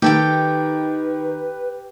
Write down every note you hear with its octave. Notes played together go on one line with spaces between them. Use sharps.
D#3 G4 A4 B4 G5